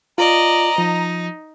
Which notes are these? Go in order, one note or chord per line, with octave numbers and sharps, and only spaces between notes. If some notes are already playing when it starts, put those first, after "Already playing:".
F4 D5 D#5 A#5
F3 D#4